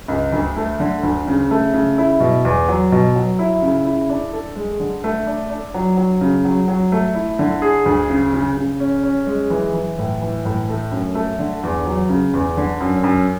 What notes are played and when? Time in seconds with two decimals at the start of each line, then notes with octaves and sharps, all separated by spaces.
0.08 C#2
0.32 D2
0.56 A3
0.80 D3
1.03 D2
1.27 C#3
1.51 A3
1.73 C#3
1.98 E4
2.20 B2
2.45 E2
2.68 F#3
2.92 B2
3.15 F#3
3.39 E4
3.62 C#3
3.85 E4
4.10 D4
4.33 A4
4.56 G#3
4.80 D3
5.04 A3
5.27 D4
5.50 D4
5.74 F#3
5.97 F#3
6.21 C#3
6.45 F#3
6.68 F#3
6.92 A3
7.15 E4
7.39 D3
7.62 G#4
7.86 D2
8.10 C#3
8.33 C#3
8.57 C#3
8.80 C#4
9.03 C#4
9.27 G#3
9.50 E3
9.74 E3
9.98 A2
10.21 E3
10.45 A2
10.68 A3
10.91 F#2
11.15 A3
11.39 D3
11.63 E2
11.86 F#3
12.09 C#3
12.33 E2
12.57 D3
12.80 F#2
13.04 F#2